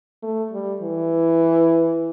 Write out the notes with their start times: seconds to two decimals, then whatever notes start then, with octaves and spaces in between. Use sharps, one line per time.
0.23 A3
0.52 G3
0.82 E3